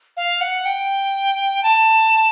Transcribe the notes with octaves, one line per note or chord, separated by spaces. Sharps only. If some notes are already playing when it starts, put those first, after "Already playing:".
F5
F#5
G5
A5